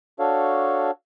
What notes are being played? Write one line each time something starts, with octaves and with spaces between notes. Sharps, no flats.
D4 F#4 A4 C#5 F5